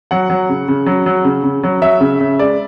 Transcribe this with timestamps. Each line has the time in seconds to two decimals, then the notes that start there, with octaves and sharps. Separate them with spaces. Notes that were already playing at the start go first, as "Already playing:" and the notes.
0.11 F#3 F#5
0.30 F#3
0.49 C#3
0.68 C#3
0.86 F#3
1.06 F#3
1.25 C#3
1.44 C#3
1.63 F#3
1.82 F#3 E5
2.00 C#3
2.20 C#3
2.39 G#3 D5